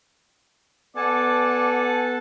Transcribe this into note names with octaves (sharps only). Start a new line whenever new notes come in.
B3 A4 D5 F#5 G#5 A5